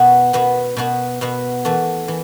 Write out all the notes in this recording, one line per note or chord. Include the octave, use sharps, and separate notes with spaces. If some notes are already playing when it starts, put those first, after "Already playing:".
Already playing: B2 B3 F#4
B2 B3 F#4
B2 B3 F#4
B2 B3 F#4
E3 A3 F#4
E3